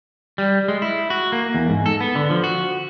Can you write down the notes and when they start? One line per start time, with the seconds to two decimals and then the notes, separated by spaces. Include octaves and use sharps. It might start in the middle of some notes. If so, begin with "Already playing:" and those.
0.38 G3
0.68 G#3
0.82 E4
1.10 F#4
1.32 A#3
1.55 E2
1.70 G#2
1.86 A4
2.00 B3
2.15 D3
2.30 F3
2.44 F#4